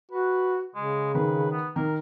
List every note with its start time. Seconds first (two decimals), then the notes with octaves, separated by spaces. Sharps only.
0.11 F#4 B4
0.75 C#3 G#3
1.15 D#3 B4
1.51 B3
1.76 D#3 A#4